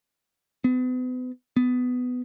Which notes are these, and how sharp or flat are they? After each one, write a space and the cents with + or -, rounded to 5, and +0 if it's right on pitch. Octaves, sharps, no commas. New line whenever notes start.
B3 +40
B3 +15